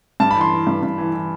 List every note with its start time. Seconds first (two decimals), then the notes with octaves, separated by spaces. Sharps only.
0.20 G2 A5
0.31 B5
0.35 E3
0.41 C6
0.51 E3
0.67 G2
0.83 G2
0.98 E3
1.14 E3